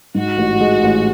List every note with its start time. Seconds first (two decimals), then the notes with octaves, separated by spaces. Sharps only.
0.15 G#2 F#4
0.37 A1
0.61 G#3
0.83 A1